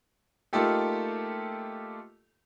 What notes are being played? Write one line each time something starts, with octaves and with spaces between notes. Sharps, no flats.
A3 A#3 D#4 F4 G4 A4